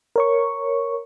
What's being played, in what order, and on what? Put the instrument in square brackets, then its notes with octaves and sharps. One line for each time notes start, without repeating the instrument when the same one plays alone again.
[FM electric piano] A#4 C#5 C#6